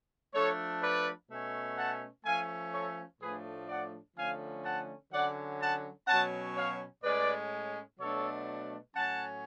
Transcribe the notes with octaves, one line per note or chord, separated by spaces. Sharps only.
F3 A3 D4 A4 C#5
B4 D5
B2 A3 C#4
F#5 A5
F3 A3 C#4 F5 G#5
A4 C#5
A2 F3 A3 D4 G#4 B4
D5 F#5
D3 F3 A3 C#4 F5 G#5
F#5 A5
D3 F#3 C#4 D5 F#5
F#5 A5
B2 F#3 C#4 F#5 A5
C#5 F5
A2 G#3 C#4 B4 D5
B2 F#3 A3 D4 A4 C#5
A2 F#3 C#4 F#5 A5